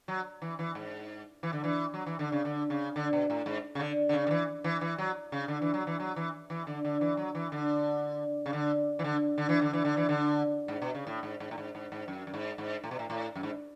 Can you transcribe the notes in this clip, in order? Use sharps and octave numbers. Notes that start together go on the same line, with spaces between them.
F#3
E3
E3
G#2
E3
D3
E3
F#3
E3
D3
C#3
D3
C#3
D3
B2
A2
G#2
C#3
D3
D3
C#3
D3
E3
E3
E3
F#3
C#3
D3
E3
F#3
E3
F#3
E3
E3
D3
D3
E3
F#3
E3
D3
C#3
D3
E3
D3
D3
E3
D3
E3
D3
E3
D3
G#2
B2
C#3
A2
G#2
G#2
A2
G#2
G#2
G#2
F#2
F#2
G#2
G#2
A2
B2
A2
A2
F#2
G#2